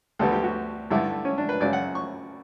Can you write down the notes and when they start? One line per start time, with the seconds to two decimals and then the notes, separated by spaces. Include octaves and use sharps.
0.19 D2 D3 G3 B3 A4
0.32 G4
0.43 F#4
0.91 G2 D3 A3 E4
1.25 C#4
1.38 D4
1.49 B4
1.60 F#2 C#3 F#3 D5
1.73 F#5
1.95 C#6